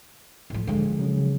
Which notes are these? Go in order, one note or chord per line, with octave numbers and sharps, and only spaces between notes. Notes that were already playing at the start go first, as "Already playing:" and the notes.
A2 F3
D3 F3 G#3
C#3 F#3